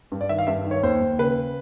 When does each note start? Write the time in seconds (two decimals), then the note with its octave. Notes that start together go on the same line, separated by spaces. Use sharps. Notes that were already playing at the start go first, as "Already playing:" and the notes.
0.12 G2
0.21 D5
0.29 D#3 E5
0.39 F5
0.47 G2 E5
0.64 D#3
0.71 C#5
0.83 D#2 C5
1.01 D#2
1.19 C#3 B4